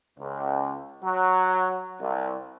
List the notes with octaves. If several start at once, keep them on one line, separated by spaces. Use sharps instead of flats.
C#2
F#3
C2